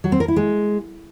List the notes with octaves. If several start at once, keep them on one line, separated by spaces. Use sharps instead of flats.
F#3
C4
A#4
E4
G#3